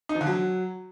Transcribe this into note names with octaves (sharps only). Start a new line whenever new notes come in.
D#4
F3
D3
F#3